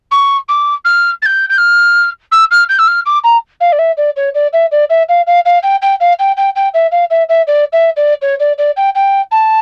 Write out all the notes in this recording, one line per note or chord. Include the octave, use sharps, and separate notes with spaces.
C#6
D6
F6
A6
G6
G6
F6
E6
F6
G6
E6
F6
D6
A#5
F5
D5
E5
D5
C#5
D5
E5
D5
E5
F5
F5
F5
G5
G5
F5
G5
G5
G5
E5
F5
E5
E5
D5
E5
D5
C#5
D5
D5
G5
G5
A5